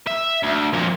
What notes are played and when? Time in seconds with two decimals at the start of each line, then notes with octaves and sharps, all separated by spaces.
0.07 E5
0.43 D2
0.73 F2 A#2